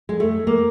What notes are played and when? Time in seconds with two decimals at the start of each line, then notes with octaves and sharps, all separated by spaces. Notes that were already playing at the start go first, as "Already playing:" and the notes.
0.09 G#3
0.20 A3
0.47 A#3